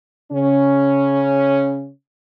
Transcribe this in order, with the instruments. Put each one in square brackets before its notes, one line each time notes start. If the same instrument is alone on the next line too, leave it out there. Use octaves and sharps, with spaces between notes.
[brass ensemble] C#3 C#4